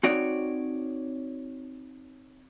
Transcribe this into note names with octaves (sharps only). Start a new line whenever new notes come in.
C4 D#4 F#4 C#5 D5